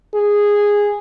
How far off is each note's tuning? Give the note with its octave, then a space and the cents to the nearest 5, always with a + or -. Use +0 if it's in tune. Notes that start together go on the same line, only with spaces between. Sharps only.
G#4 -10